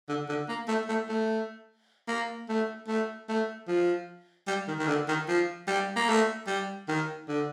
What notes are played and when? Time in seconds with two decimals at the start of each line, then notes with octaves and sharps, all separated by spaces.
0.09 D3
0.29 D3
0.48 A#3
0.68 A3
0.89 A3
1.09 A3
2.08 A#3
2.49 A3
2.88 A3
3.29 A3
3.68 F3
4.47 G3
4.68 D#3
4.79 D#3
4.87 D3
5.08 D#3
5.28 F3
5.67 G3
5.96 A#3
6.08 A3
6.47 G3
6.88 D#3
7.28 D3